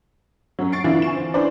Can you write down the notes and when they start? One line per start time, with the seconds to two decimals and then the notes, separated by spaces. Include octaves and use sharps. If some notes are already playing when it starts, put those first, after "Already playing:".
0.59 F#2 F#3
0.72 C#6 A6 C7 D7
0.84 D3 E3 D4 E4 F4
1.02 G#5 C#6 E7
1.15 C4
1.34 C#4 D4 E4 B4 C5 D5